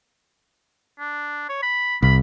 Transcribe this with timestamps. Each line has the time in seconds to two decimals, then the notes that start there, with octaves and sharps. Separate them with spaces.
0.99 D4
1.49 C#5
1.62 B5
2.03 C2 B5